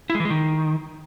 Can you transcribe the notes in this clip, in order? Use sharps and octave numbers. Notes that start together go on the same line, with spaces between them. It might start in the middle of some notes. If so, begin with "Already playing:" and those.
E4
G#3
E3
G#3
D#3